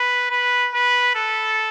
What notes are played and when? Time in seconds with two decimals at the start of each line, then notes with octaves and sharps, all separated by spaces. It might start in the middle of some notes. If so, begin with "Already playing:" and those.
Already playing: B4
0.31 B4
0.74 B4
1.15 A4